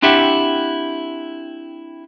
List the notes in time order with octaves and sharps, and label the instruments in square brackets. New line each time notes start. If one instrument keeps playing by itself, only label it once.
[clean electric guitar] C4 D4 E4 G4 E5 F#5